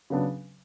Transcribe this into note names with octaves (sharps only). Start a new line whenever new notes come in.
C#3 F#3 B3 D4